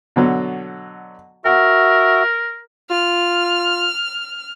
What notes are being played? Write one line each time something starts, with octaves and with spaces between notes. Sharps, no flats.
B2 D3 F#3
F#4 A#4 E5 F#5
F4 F6